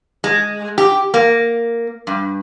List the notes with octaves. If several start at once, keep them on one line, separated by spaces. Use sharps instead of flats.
G#3
G4
A#3
G2